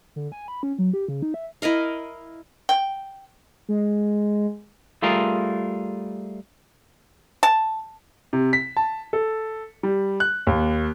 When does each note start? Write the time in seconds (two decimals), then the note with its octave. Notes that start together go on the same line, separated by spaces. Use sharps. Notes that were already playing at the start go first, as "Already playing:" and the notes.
0.16 D3
0.32 G#5
0.48 B5
0.63 C#4
0.79 F#3
0.93 G4
1.08 C#3
1.22 D#4
1.34 E5
1.62 E4 A#4 D#5 F5
2.69 G5
3.69 G#3
5.02 G3 A3 F4 G#4 A#4
7.43 A5
8.33 C3
8.53 B6
8.77 A5
9.13 A4
9.83 G3
10.20 F#6
10.47 D#2